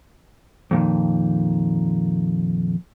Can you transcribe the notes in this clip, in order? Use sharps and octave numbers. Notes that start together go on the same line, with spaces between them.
F2 A#2 D#3